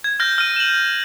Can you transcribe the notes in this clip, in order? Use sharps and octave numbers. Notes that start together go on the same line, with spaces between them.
G#6
F6 G6 A#6
F6 D#7
E7 F#7